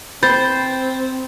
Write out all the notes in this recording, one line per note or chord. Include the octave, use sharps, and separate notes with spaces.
C4 C5 B5 G6 A6